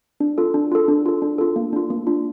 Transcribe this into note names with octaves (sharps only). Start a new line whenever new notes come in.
D4
F4 A4
D4
F4 A4
D4
F4 A4
D4
F4 A4
A#3
D4 F4
A#3
D4 F4